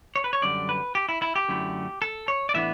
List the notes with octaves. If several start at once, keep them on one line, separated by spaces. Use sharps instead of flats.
C#5
B4
C#5
F#2 D3 G3 D5
B4
G4
E4
E4
G4
F#2 D3 A3 E4
A4
C#5
D5
A2 E3 B3 D4 E5